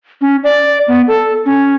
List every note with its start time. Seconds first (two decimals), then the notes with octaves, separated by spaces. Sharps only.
0.21 C#4
0.44 D5
0.88 B3
1.08 A4
1.46 C#4